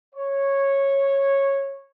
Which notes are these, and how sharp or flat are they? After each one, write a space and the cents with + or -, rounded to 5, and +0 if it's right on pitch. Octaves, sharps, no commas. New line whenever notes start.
C#5 -10